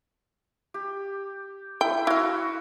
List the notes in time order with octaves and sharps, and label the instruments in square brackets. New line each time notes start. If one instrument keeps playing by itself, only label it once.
[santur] G4
[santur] E4 [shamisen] G5
[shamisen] E4 F5 [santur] F#4